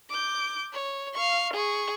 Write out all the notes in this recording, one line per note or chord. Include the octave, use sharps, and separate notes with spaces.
D6 G6
C#5
F5 C#6
G#4 C#6